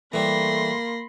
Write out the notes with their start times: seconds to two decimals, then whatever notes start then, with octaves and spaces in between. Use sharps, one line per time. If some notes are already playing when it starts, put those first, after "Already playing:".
0.14 E3 G3 A3 A#3 B5 C6 A#6